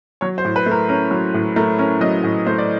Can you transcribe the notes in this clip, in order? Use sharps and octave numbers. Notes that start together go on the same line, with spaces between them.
F#3 C#5
C5
A2
B4
A3
A#4
C#4 A#4
F#3
A2
A3 A#4
C#4 A#4
F#3 D#5
A2
A3 C5
D5